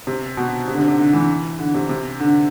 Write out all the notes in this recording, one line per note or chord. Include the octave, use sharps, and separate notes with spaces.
C3
B2
C3
D3
C3
C3
D3
E3
D3
C3
C3
D3